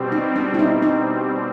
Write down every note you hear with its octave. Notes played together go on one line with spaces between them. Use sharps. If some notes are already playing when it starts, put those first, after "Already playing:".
Already playing: B2 G3 C4
D#4
D4
E4
D#4
D#4